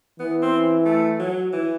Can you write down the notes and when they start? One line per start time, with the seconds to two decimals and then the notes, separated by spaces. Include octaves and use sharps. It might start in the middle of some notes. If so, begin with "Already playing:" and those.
0.19 E3 B3
0.42 C4
0.86 A3
1.20 F#3
1.53 E3